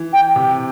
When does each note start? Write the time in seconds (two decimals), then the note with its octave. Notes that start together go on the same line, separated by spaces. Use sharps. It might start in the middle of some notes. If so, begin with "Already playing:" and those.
Already playing: E3
0.13 G5
0.36 C3